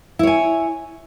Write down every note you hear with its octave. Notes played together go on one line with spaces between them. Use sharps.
E4 C#5 G#5